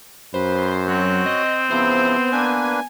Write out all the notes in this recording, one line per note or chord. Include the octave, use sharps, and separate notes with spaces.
F#2 B4 C5
F#3 C4 F#4 C#5 F#6
D#5
C#3 F3 B3 E4 C5
A#3 D4 B4 G#5